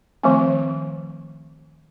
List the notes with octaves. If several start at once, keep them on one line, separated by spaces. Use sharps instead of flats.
D#3 F3 A3 C4